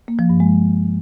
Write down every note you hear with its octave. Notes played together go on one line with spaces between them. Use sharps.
A#3
F3
G2
G#3